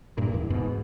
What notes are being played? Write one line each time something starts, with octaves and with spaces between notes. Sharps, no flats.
G2 A#2
E2
G#2 B2